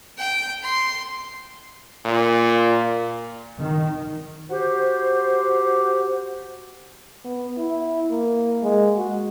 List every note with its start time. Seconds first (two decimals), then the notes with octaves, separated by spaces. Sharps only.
0.18 G5
0.64 C6
2.05 A#2
3.60 D#3
4.50 F#4 G4 C5
7.24 B3
7.58 E4
8.11 A#3
8.63 G#3
8.97 F#4